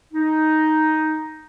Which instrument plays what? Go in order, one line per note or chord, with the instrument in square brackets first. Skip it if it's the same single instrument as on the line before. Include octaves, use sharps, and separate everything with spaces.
[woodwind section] D#4